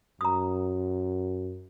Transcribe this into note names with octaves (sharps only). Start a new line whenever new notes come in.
F#2 A#5 D#6